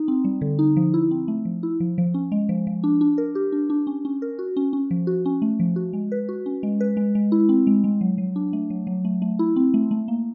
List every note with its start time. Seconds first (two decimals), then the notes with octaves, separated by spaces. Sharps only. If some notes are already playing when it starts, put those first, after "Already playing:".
Already playing: D#4
0.08 C4
0.25 G3
0.41 D3
0.59 D#4
0.77 F3
0.94 E4
1.11 C4
1.28 A3
1.45 F3
1.63 E4
1.80 F3
1.98 F3
2.14 C#4
2.32 G#3
2.49 F3
2.67 F3
2.84 D4
3.01 D4
3.18 A#4
3.35 G4
3.52 D4
3.70 D4
3.87 C#4
4.05 C#4
4.22 A#4
4.39 F#4
4.57 C#4
4.73 C#4
4.91 F3
5.07 F#4
5.26 C#4
5.42 A3
5.60 F3
5.76 F#4
5.93 G#3
6.12 B4
6.29 F#4
6.46 C#4
6.63 G#3
6.81 B4
6.97 G#3
7.15 G#3
7.32 E4
7.49 C4
7.67 G#3
7.84 G#3
8.01 F#3
8.18 F#3
8.36 D4
8.53 A3
8.70 F#3
8.87 F#3
9.05 A3
9.22 A3
9.39 E4
9.56 C4
9.74 A3
9.91 A3
10.08 A#3